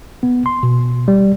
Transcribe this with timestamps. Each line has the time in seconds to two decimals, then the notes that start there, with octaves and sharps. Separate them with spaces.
0.23 B3
0.46 C6
0.63 B2
1.08 G3